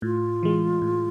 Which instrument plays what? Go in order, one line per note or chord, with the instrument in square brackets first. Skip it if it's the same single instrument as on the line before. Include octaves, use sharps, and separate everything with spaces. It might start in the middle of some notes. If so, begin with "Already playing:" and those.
[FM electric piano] A2 [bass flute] F4
[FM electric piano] E3 G#3
A2